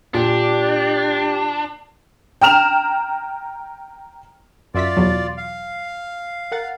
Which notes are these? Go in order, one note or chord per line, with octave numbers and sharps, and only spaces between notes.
A#2 D4 G4
G5 A#5 F6 E7 F7
F#2 F4 D5 E5 B6
E2 B2 F#3
F5
A#4 F#5 A6